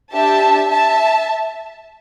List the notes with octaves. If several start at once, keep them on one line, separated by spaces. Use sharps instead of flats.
D4 G4 E5 A5
E5 A5